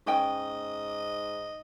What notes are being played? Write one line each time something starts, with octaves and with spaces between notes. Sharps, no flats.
G#2 C#4 D#5 G5